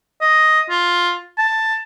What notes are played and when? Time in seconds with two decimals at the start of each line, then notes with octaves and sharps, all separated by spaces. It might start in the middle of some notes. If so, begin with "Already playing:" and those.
0.21 D#5
0.70 F4
1.38 A5